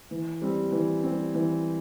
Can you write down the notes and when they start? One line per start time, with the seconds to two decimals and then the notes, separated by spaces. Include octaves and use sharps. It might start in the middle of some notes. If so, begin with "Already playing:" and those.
0.11 E3
0.42 G3 C4
0.72 E3
1.04 G3 C4
1.35 E3